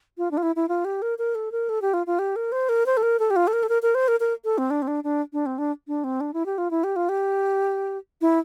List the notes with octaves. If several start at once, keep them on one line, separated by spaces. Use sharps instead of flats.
F4
D4
F4
E4
E4
F4
G4
A#4
A#4
A4
A#4
A4
G4
F4
F4
G4
A#4
C5
A#4
C5
A4
A#4
A4
G4
F4
A4
A#4
A4
A#4
A#4
C5
A#4
A#4
A4
C4
D4
C4
D4
D4
D4
C4
D4
D4
C4
D4
E4
G4
F4
E4
G4
F4
G4
E4